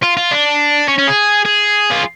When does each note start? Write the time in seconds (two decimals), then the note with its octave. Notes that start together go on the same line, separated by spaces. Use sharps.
0.03 F4
0.17 F4
0.31 D4
0.88 C#4
0.98 C#4
1.07 G#4
1.45 G#4
1.91 F4